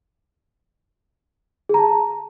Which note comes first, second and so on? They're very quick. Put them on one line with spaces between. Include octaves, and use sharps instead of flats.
G#4 A#5 A5